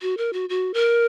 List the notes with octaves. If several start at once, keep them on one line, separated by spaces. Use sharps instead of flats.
F#4
A#4
F#4
F#4
A#4